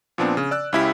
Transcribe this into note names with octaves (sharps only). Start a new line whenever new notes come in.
A#2 F3 B3 C4 D4
C#3
D5 E6 F#6
C#2 C#4 E4 G4 B6